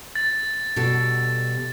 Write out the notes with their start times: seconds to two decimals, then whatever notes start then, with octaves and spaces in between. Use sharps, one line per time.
0.15 A6
0.76 B2 G3 A4